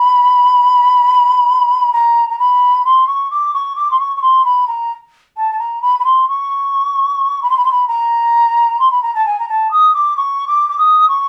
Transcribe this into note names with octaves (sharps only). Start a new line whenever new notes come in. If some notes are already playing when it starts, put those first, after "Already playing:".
Already playing: B5
A#5
A#5
B5
C6
C#6
D6
C#6
D6
C6
C#6
C#6
C6
B5
A#5
A5
A5
A#5
B5
B5
C6
C#6
B5
C6
B5
C6
B5
A#5
C6
B5
A#5
A5
G#5
A#5
A5
D#6
D6
C#6
D6
D6
D#6
C#6